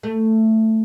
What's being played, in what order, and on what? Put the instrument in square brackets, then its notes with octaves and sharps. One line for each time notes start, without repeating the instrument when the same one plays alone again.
[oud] A3